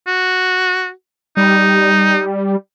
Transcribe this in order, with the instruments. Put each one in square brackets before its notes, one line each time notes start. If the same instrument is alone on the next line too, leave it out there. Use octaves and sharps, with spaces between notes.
[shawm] F#4
[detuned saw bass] G3 [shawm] D#4